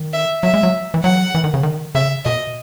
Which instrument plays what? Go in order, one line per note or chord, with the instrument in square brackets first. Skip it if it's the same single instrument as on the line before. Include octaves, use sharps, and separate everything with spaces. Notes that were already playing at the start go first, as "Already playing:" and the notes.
Already playing: [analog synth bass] D#3
[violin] E5
[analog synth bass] F#3 [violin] E5
[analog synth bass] G#3
F#3
E3
[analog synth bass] F#3 [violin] F#5
[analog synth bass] E3
D#3
C#3
D#3
[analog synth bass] C#3 [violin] E5
[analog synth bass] B2 [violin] D#5